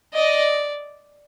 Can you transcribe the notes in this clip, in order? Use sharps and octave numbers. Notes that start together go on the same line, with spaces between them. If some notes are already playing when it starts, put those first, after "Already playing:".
D5 D#5